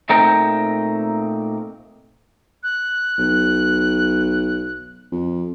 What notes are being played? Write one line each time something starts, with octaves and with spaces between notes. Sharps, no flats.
A#2 A3 C4 D#4 A#4 G5
F#6
B1
F2